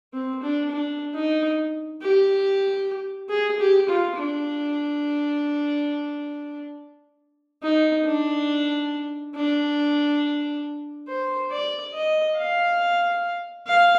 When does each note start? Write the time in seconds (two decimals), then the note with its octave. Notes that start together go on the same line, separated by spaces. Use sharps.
0.13 C4
0.42 D4
0.71 D4
1.14 D#4
2.01 G4
3.30 G#4
3.59 G4
3.88 F4
4.16 D4
7.62 D#4
8.05 D4
9.35 D4
11.08 C5
11.51 D5
11.93 D#5
12.37 F5
13.67 F5